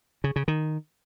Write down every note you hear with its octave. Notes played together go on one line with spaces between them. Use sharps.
C#3
C#3
D#3